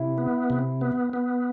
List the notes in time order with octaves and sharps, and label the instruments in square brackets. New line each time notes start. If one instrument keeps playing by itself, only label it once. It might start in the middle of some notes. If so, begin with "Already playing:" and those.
Already playing: [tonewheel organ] C3 [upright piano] E4
[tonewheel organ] B3
C3
B3
B3